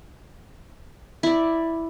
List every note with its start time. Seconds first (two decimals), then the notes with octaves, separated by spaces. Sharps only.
1.23 E4 D5